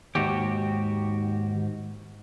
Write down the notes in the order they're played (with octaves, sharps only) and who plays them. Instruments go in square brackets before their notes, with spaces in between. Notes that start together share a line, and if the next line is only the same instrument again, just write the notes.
[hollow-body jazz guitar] D#2 [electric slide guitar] G#2 F#4 G4